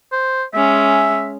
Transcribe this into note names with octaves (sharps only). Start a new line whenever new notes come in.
C5
G#3 C#4 E5